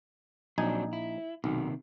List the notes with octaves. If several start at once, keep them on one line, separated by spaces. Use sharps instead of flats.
A#1 F#3 C4 D4 D#4 G#5
E4
B1 C3 D#3